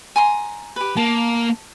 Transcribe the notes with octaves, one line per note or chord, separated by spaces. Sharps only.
G#5 A#5 C6
G4 B4
A#3 A5